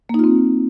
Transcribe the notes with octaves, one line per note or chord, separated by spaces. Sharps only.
A#3 C4 D#4 F4